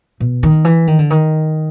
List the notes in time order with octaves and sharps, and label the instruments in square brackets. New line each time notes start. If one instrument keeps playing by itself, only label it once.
[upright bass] B2
D#3
E3
D#3
D3
D#3